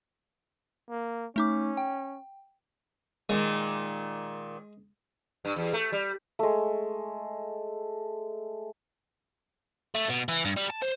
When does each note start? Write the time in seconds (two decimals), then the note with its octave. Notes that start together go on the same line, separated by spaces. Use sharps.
0.90 A#3
1.36 A3 C#4 D#4 D6
1.77 G5
3.29 A#2 D#3 G#3
5.45 G2
5.56 E2
5.73 A3
5.92 G3
6.39 G#3 A3
9.95 A3
10.09 B2
10.29 E3
10.45 G2
10.56 G3
10.70 A5
10.82 C5